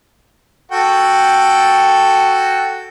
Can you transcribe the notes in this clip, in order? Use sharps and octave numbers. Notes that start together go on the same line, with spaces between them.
F#4 A4 G5